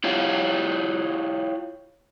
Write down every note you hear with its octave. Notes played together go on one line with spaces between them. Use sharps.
E4 F4 G4 C#5 F5